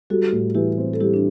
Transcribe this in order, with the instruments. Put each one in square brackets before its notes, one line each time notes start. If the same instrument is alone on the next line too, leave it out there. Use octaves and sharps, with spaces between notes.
[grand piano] G3 [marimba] F#4 A4
[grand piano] A2
[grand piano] E3 [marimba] E4 G4
[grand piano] C4
[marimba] A4
[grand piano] G3 [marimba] E4 G4
[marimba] D4